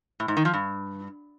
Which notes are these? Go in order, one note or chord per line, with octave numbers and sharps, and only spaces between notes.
A2
G#2
D#3
F3
G2